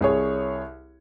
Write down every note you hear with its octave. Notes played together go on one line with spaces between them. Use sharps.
C2 G#4 C#5